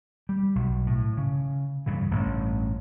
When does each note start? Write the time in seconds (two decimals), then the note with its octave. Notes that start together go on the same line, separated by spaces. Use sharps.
0.29 G3
0.55 B1
0.86 A2
1.17 C#3
1.86 G2 C#3 E3
2.11 A1 G2